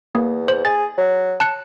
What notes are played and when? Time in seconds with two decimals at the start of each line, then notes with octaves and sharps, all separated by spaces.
0.15 E2 A#3
0.48 C5
0.65 G#4 A6
0.98 F#3
1.40 A5 F#6 C#7